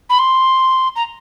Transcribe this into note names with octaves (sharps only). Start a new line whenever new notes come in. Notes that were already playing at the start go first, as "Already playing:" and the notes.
B5
C6
A#5